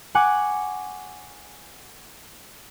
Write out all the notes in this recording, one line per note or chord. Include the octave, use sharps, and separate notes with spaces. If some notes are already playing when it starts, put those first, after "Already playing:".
F#5 G#5 C#6 D6 F#6